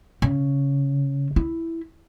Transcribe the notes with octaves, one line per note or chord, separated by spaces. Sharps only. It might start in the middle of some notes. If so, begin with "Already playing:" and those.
C#3
E4